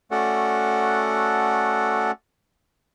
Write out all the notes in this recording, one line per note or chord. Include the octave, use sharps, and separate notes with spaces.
A3 C#4 F#4 A4 D5 F#5